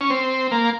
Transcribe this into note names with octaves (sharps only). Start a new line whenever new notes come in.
C#4
C4
A#3